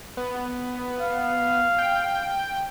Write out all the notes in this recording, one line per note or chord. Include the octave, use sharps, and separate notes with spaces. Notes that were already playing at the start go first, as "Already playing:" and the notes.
B3
F5
G5